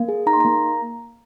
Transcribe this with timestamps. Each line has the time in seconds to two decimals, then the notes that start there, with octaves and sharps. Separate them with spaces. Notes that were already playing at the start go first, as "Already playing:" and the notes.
Already playing: A#3
0.08 G#4
0.26 D#4 A#5
0.33 C6
0.41 A#3 A#5